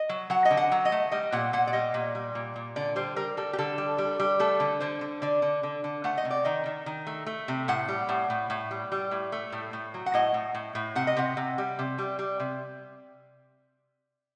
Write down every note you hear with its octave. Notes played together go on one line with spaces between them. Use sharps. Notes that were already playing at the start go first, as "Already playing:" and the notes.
Already playing: D#5
F#3
F#3 F#5
D#5
D3
F#5
F#3
D#5
A3
G3 D#5
A#2 F#5
A#2 F#5
D5
G3 D#5
A#2
G3
A#2
A#2
D3 D5
G3 C5
G3 A#4
G3 A4
G4
D3 A4
G3
G3
G3
A3 A4
D3
D3 C5
D3
D3 D5
D3
D3
D3
A3 F#5
D#5
C3
D5
D#3 D#5
D#3
D#3
A3
A3
C3
A2 F#5
G3
A2
A2
A2
G3
G3
A2
A3
A2
A2
F#3
F#5
A2 D#5
A2
A2
A2
C3 F#5
D#5
C3 F#5
C3
G3
C3
G3
G3
C3